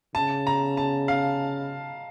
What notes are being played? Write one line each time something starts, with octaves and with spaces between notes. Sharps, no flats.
C#3 A5
A#5
A5
F5